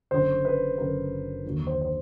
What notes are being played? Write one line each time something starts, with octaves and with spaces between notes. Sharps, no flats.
F#1 F#2 D3 C5
B4
F#1 F#2 D3 A#4
D#2 D3 F#3
C5
C5